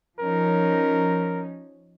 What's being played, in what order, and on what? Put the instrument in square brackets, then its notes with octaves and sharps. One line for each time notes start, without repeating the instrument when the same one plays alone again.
[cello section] F3 C#4 D#4 [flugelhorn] A#4